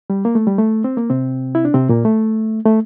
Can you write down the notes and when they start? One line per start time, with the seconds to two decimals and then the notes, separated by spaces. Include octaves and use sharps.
0.10 G3
0.25 A#3
0.35 A3
0.47 G3
0.58 A3
0.84 C4
0.97 A#3
1.10 C3 C4
1.55 E4
1.65 D4
1.74 C3 C4
1.89 A#2 A#3
2.05 A3
2.65 A3